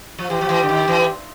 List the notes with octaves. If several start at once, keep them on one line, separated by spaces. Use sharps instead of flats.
F3
E3 G4
F3
E3
D3
D#3
E3